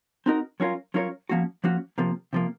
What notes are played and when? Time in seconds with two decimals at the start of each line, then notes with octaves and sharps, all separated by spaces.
0.26 C4 D#4 F#4 A#4 D#5
0.60 F#3 C#4 F4 A#4 C#5
0.94 F#3 C#4 F4 A#4 C#5
1.29 F3 A#3 C#4 F#4
1.64 F3 A#3 C#4 F#4
1.98 C3 F3 A#3
2.33 C3 F3 A#3